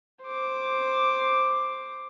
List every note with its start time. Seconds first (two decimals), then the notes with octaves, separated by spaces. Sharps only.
0.23 C5 D6